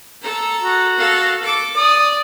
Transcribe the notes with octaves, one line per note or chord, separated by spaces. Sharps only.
A4 A#5
F#4
A4 F5
A4 D6
D5 D#6